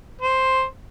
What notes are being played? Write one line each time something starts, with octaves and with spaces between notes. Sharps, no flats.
C5